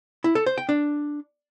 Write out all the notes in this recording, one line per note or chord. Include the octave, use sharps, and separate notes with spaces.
E4
A4
C5
G5
D4